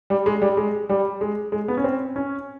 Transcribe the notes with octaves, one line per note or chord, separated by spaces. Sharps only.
G3
G#3
G3
G#3
G3
G#3
G#3
B3
C#4
C4
C#4